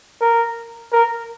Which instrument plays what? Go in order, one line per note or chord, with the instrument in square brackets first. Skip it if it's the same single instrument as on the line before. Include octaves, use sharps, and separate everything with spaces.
[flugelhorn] A#4
A#4